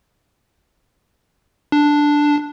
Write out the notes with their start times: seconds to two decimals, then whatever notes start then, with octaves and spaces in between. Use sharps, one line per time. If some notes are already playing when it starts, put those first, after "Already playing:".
1.72 D4